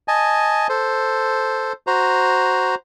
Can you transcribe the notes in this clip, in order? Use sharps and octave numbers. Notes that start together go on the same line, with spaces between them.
D#5 G#5 A5
A4 C5
F#4 C5 A#5